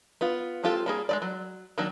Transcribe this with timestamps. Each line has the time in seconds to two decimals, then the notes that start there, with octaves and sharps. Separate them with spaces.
0.21 B3 F4
0.63 G#3 C4 F4 G4 A4
0.86 G3 A#3 G#4
1.09 G#3 A3 D5
1.22 F#3
1.78 D#3 F#3 A#3 D4